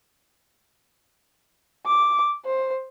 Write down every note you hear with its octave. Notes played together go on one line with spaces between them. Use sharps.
D6
C5